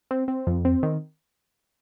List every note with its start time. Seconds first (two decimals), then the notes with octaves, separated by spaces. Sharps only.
0.11 C4
0.28 C4
0.47 F2
0.65 C4
0.83 D#3